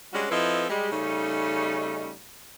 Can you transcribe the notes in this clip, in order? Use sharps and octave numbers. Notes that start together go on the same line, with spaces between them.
G3 G#3 C#4 D4 F#4
F3 C4 E4 A4 B4 D#5
G3 G#3
C#3 G3 A3 C#4 D#4